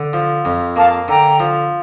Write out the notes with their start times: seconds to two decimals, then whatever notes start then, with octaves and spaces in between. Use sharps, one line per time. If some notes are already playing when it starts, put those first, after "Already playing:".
Already playing: D3
0.13 F3
0.45 F2
0.76 A#3 F5 A5
1.08 D3 G5 A#5
1.40 F3